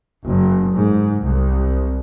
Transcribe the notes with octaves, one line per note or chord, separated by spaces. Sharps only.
F#1
G#2
C2